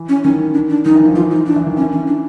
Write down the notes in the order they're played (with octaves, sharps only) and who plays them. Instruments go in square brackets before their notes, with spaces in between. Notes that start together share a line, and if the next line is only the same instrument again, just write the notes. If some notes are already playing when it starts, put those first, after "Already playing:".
Already playing: [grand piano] E3
[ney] C#4
[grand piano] D#3 [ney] C#4
[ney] D4
D4
[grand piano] D#3 [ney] D#4
[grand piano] E3
F3
[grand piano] E3 [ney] F4
[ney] D#4
D4
[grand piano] E3
D#3
[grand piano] E3 [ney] C#4
[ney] C#4
D4